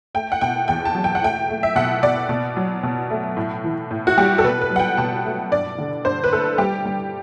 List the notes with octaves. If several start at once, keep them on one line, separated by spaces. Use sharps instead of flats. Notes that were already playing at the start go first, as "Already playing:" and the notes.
A3 G5
F#5
B2 G5
E2 G5
A5
F#3
G5
F#5
A3 G5
A3
E5
B2 F#5
B2 D5
B2
F#3
B2
A3
A2
E3
A2
F#4
G3 G4
A4
B2 B4
B4
F#3
F#5
G5
B2 A5
A3
G2 D5
D3
G2 C5
B4
A3 A4
G3 G4
G3